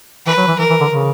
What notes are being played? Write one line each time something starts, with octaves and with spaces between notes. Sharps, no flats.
E3 B4
F#3
E3
E3 A#4
E3
D3
C#3